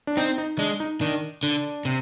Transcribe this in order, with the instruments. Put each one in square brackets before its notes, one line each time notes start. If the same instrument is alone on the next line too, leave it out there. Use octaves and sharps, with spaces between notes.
[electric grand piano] D4
[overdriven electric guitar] C4 [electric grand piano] D#4
[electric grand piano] D#4
[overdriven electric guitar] G#3 [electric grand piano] D4
[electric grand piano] D#4
[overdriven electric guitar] D#3 [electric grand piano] D4
[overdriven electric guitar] D3 [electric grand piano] D4
[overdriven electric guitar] C3